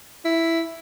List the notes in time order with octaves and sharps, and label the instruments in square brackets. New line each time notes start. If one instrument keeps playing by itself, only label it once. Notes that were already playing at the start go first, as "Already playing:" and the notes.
[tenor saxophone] E4